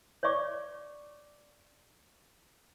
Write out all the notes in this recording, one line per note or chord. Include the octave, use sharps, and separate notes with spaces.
C#5 D5 E5 C#6 D6